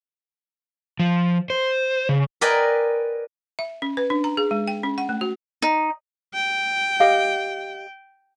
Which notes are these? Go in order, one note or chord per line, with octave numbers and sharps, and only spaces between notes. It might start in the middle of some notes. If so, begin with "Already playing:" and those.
F3
C5
C#3
A#4 B4 D5 D#5 G5 G#5
E5
C#4
B4
D4
A#5
G#4
G#3
G5
C#4
F#5
A3
F#4
D#4
G5
G4 D#5 F5